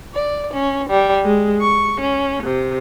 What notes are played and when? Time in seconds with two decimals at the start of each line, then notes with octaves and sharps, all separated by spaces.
0.15 D5
0.54 C#4
0.90 G3
1.25 G#3
1.62 C#6
2.01 C#4
2.43 C3